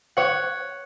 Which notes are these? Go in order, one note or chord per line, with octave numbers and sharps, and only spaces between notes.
C#5 F#5